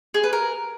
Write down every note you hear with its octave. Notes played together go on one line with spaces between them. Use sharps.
G#4
B4
A#4